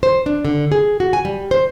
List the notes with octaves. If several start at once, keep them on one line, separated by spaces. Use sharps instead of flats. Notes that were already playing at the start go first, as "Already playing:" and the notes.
C5
D4
D3
G#4
F#4
G#5
G3
C5